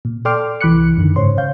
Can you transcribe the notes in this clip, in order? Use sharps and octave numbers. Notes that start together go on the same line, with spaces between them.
A#2
A4 D5 G5 C6 D6 F6
C2 E3 B5 D6 F#6 C#7
F#2 D3 D#3
G#2 C#3 C5 C#5 C6
C#5 F5 G6